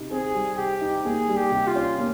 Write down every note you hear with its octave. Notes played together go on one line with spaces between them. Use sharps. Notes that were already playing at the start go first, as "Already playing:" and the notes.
Already playing: C3 D#4
C4 G#4
G3
C3 G4
D#4
A#3 G#4
G3
G4
C3
F4
C#4
A#3